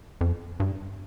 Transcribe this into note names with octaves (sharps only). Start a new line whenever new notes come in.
F2
G2